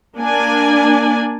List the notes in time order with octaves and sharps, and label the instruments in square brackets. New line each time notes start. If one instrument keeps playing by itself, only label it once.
[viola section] A#3 D4 D5 G#5